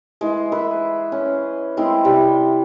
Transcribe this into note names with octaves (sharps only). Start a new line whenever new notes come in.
E3 G#3
B4 E5
C#4
G#3 C4 E4
C3 G3